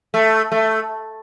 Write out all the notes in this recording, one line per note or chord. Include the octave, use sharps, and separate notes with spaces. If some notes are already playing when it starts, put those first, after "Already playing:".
A3
A3